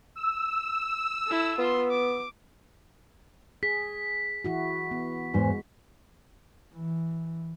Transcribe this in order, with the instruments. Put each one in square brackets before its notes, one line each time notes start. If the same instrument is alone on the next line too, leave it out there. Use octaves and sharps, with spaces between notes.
[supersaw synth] E6
[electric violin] E4 A4
[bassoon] B3 [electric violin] F4 C6
[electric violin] D6
[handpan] G#4 [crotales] B6
[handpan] E3 E4 F#4
B3
[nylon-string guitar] E2 G#2 C5 [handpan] G#3
[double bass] E3